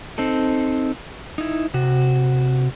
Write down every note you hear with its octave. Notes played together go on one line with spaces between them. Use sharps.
C4 D#4 A4
D#4 E4
C3 F#4